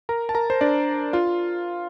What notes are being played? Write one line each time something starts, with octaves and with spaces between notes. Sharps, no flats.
A#4 A#5
A5
A#4 A#5
C5
D4 D5
F4 F5